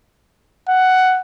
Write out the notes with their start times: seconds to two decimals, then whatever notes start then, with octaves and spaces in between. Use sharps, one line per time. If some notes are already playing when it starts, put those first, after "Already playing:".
0.69 F#5